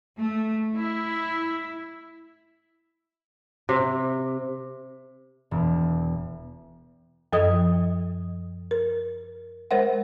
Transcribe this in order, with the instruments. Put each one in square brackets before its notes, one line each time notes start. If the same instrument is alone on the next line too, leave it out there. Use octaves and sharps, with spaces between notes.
[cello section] A3
E4
[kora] C3
[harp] E1
[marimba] F#2 F3 A4 D#5 D#6
A#4
G#3 A#4 C5 E5 F#5